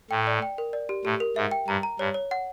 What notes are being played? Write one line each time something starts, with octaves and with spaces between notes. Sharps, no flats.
A2 G5
D5
G5
A#4
D5
G4
A2 G4
A#4
G#2 E5
G5
G2 A#5
A#5
G2 C#5
C#5
F#5